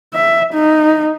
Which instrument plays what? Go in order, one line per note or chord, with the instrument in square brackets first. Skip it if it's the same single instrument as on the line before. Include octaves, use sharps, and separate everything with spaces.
[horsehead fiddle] E5
D#4